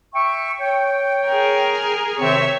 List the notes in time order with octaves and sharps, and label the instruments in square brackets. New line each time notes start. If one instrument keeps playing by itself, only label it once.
[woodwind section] E5 G5 C#6
C#5 G5
[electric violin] G#4 A#4
[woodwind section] C3 D#3 C4 [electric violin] C#5 E5